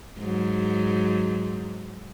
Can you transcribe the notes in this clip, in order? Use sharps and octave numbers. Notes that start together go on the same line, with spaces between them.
G#2 F#3